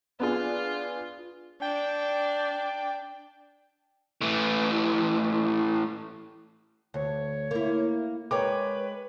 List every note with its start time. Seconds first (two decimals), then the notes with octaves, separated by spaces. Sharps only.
0.20 B3 D4 F4 G#4
1.62 D4 G5
4.21 A2 E3
6.94 D2 C#5
7.51 A#3 E4
8.31 G#3 A#4 B4 C#5 G5 D6